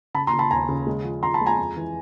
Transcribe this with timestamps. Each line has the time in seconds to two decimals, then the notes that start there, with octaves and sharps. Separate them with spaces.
0.14 C#3 A5 B5
0.27 A#5 C6
0.33 C#3
0.39 A5 B5
0.51 D#2 G#5 A#5
0.69 C#3
0.87 G#3
1.04 F3
1.23 F3 A#5 C6
1.34 A5 B5
1.41 G#3
1.46 G#5 A#5
1.58 F2
1.76 E3